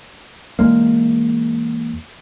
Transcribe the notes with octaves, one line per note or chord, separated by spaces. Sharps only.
E2 G#3 A#3